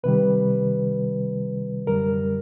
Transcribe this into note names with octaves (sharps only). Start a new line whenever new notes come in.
C2 C3 D#3 G3 B4
F#2 D3 G3 A#4